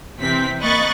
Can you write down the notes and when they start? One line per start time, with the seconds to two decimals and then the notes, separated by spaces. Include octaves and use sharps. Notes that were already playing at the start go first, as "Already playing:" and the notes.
0.19 C3 E3 C4 B6
0.61 A#3 D#5 B5 C#6 F#6 A6